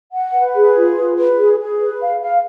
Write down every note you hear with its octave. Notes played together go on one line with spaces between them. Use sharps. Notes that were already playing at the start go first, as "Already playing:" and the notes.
F#5
B4
G#4
F4
B4
B4
G#4
G#4
B4
F5
F5